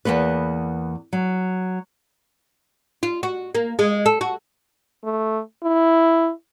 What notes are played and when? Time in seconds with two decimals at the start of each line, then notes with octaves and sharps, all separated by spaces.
0.05 E2 G#2 A#3 B3 B4
1.13 F#3
3.03 F4
3.23 F#4
3.55 A#3
3.79 G#3
4.06 A4
4.21 F#4
5.04 A3
5.63 E4